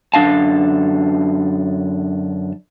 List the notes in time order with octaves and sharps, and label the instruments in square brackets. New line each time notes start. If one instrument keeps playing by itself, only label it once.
[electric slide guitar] F#2 D3 D4 F5 A5